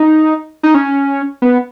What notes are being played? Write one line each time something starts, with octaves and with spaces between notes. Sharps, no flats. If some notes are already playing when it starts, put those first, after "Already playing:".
Already playing: D#4
D#4
C#4
B3